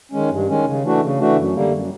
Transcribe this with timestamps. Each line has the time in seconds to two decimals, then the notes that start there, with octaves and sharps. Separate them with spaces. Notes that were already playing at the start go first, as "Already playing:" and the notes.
0.12 D#3 G#3 C#4
0.30 G2
0.48 D#3 G#3 C#4
0.65 C#3
0.83 E3 A3 D4 F#4
1.01 C#3
1.19 E3 A3 D4 F#4
1.37 F#2
1.55 D3 G3 A#3
1.72 F#2